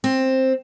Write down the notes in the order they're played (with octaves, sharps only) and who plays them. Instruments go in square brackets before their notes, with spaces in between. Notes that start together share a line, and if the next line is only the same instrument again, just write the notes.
[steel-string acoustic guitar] C4